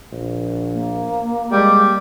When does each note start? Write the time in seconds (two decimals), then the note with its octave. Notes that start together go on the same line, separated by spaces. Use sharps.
0.12 A#1
0.74 A#3
1.52 G3 G#3